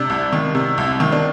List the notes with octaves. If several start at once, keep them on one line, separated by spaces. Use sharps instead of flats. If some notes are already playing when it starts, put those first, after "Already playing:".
Already playing: C3 D4
C2
D#3
C3
C2
D#3
D4